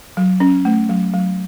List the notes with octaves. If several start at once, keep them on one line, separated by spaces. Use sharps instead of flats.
F#3
C#4
A3
F#3
F#3